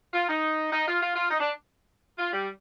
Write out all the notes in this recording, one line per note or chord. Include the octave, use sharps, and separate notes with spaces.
F4
D#4
D#4
F4
F4
F4
D#4
D4
F4
G3